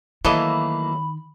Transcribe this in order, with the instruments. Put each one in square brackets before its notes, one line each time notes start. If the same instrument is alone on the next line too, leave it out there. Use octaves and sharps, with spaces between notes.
[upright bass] D#3 [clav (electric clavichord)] E3 A4 D#5 [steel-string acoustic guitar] F#3 A3 A#3 [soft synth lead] B5